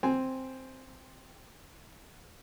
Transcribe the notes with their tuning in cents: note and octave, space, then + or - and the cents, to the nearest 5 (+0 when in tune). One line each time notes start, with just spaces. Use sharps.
C4 +0 G#5 +0